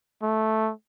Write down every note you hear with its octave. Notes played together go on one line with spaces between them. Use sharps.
A3